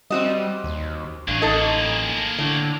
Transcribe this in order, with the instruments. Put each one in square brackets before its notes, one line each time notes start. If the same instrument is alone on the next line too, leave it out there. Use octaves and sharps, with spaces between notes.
[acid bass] G3 [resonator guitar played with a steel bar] C4 F#4 D#5
[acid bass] D#2
[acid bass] A1 [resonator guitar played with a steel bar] G2 [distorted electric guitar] A#3 G#4
[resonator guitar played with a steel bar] D#4 A4 D#5
[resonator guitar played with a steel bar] A2 [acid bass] D3